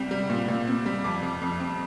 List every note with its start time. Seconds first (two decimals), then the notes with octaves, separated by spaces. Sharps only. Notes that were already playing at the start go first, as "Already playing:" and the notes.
Already playing: C2 G3 C4
0.11 G3
0.30 A#2
0.48 A#2
0.67 C4
0.86 G3
1.04 F2 D6
1.22 F2
1.42 F2
1.60 C4